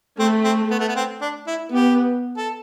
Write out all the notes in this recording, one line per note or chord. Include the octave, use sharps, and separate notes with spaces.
A3 C4
C4
B3
A3
B3
C4
D4
E4
B3 G4
A4